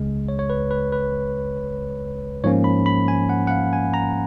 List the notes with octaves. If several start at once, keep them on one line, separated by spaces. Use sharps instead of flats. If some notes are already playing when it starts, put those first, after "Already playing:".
Already playing: C#2 C#3 G#3
C#5
C#5
B4
B4
B4
G#2 F3 A#3 C#4 C#5
B5
B5
G#5
F#5
F#5
F5
G#5
A#5